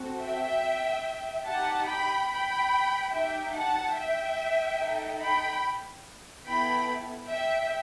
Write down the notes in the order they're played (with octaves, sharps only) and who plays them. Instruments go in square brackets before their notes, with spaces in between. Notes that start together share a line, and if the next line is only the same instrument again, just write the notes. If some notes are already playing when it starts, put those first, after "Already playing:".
Already playing: [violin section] C4 F#4 A4
E5 G5
D#4 G4 F#5 A5
G5 B5
G5 B5
D#4 G4 E5 G5
F#5 A5
E5 G5
D#4 A4
G5 B5
B3 E4 A4 G5 B5
E5 G5